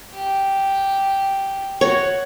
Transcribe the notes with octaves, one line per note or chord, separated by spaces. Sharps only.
G4
F#4 C#5